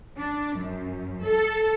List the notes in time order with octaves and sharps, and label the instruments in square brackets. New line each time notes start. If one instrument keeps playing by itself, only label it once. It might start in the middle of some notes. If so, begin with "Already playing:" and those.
[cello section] D4
F#2
A4